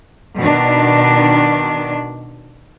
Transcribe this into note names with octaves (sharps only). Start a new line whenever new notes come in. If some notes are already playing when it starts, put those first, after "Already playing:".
B2 D#3 D4